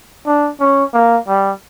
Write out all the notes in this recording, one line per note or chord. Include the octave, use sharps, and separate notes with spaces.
D4
C#4
A#3
G3